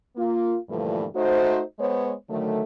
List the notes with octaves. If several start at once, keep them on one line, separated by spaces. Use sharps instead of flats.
A#3 F4
G2 A#2 D3 E3 F3 A3
A3 D#4 F#4 C5
G#3 B3 C5 C#5
D3 D#3 F#3 A3